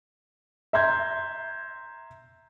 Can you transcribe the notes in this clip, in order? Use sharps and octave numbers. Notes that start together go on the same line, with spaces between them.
E5 A#5 C6 G6 G#6